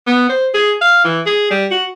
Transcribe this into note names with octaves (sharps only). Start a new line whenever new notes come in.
B3
C5
G#4
F5
E3
G#4
G3
F#4